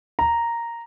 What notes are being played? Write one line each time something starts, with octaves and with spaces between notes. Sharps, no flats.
A#5